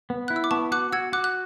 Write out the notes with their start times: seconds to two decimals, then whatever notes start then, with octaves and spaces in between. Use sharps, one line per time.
0.10 B3
0.28 E4 F#6
0.36 E6
0.44 D6
0.51 B3 A5 C#6
0.72 F#4 D6 F#6
0.92 F#4 E6 G#6
1.13 F#4 D6 F#6
1.24 F#6